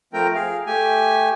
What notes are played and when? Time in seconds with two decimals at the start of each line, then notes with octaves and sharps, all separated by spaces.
0.13 F3 A3 C4 A#4 G5
0.34 G#4 F5
0.66 A3 G4 G#5